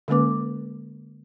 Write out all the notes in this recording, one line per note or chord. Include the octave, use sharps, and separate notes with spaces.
D3 G#3 A#3 C#4 B4 D6